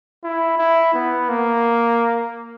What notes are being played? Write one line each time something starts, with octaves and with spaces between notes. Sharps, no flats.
E4
E4
B3
A#3